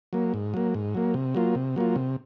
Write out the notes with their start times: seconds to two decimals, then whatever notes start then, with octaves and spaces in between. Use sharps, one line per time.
0.13 F#3 A#3
0.34 G#2
0.54 F#3 A#3
0.74 G#2
0.95 F#3 A#3
1.14 C3
1.35 F#3 A#3 F4
1.55 C3
1.76 F#3 A#3 F4
1.96 C3